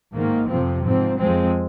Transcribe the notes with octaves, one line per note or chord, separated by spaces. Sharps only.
G#2 D#3 A#3
F2 C3 F3 C4
G#2 F3 C4
F2 F3 G#3 C4